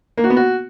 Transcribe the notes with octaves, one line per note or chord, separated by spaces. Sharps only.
A#3
F#4
B3
F#4